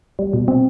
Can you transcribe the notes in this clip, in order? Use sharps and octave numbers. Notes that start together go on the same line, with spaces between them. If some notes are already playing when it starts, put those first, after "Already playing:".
G3
B2
C4